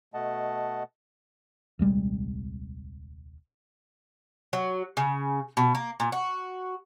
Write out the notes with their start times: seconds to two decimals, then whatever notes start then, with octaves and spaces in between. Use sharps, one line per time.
0.14 B2 A3 D#5 F#5 A5
1.79 D#1 C2 G3 G#3
4.53 F#3
4.97 C#3
5.57 B2
5.75 A#3
6.00 A#2
6.12 F#4